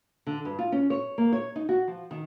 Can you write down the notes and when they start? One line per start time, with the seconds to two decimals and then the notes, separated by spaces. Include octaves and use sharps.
0.27 D3
0.45 G2
0.59 F4
0.72 C#4
0.90 C#5
1.18 A#3
1.33 C#5
1.56 D#4
1.69 F#4
1.88 F3
2.11 D#3